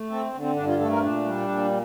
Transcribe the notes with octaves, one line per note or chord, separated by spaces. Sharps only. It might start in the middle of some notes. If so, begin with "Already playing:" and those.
Already playing: A3
C4 A4
D3
C4
G2 D4
F4
A3 A4
A#4
C4
A#2 D4
G3
A#2